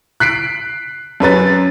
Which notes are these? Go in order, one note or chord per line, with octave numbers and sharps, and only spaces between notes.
F#6 B6 C7 D7
F#2 C#4 B4 A6